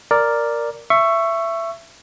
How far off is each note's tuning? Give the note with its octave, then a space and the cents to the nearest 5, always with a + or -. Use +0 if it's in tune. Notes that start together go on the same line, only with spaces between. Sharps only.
A#4 +0 D5 +0
E5 +20 C#6 +0